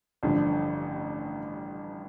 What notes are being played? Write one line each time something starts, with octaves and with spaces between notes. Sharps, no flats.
A1 G2 D3 F3